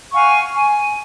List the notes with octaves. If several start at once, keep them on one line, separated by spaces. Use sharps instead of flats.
F5 F#5 G#5 C#6
G#5